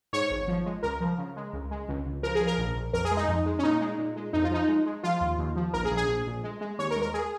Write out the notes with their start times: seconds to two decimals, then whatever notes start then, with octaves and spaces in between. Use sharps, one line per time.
0.13 G#2 C#5
0.31 G#1
0.48 F3
0.66 G#3
0.83 C#2 A#4
1.01 F3
1.18 C#3
1.36 G#3
1.53 C#2
1.71 G#3
1.88 C#2
2.06 C#2
2.23 F3 A#4
2.35 G#4
2.41 F3
2.47 A#4
2.58 A#1
2.76 A#1
2.93 F2 A#4
3.05 G#4
3.11 G#3
3.17 D#4
3.28 F2
3.46 G#3
3.59 C#4
3.63 A#2 D#4
3.81 G#3
3.98 A#2
4.16 G#3
4.33 F2 D#4
4.44 F4
4.51 F3 D#4
4.68 G#3
4.86 G#3
5.03 F3 F4
5.21 D#2
5.38 D#2
5.56 F3
5.73 A#1 A#4
5.85 G#4
5.91 A#1
5.97 G#4
6.08 A#1
6.27 A#1
6.44 G#3
6.61 G#3
6.79 D#2 C#5
6.91 A#4
6.96 G#3
7.02 A#4
7.14 G#4